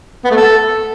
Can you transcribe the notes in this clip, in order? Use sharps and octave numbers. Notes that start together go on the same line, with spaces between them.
B3
A3
A4